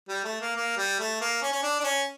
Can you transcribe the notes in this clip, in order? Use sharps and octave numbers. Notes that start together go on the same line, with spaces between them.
G3
A3
A#3
A#3
G3
A3
A#3
C#4
C#4
D4
D4
C#4